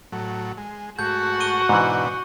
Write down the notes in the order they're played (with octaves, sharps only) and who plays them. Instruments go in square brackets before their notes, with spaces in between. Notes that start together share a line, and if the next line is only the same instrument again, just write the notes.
[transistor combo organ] A2 F#3
G#3
[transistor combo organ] G#2 A3 [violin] F#4 F#5 [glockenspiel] G6
[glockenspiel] C#6 D#7 G7
[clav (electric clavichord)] G#2 E3 [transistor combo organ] B2 D4